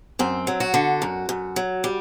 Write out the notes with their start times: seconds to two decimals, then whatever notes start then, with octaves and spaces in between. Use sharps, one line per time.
0.19 F#2 C4
0.47 F#3
0.60 F#4
0.74 D3
1.02 F#2
1.29 F#2
1.56 F#3
1.84 G3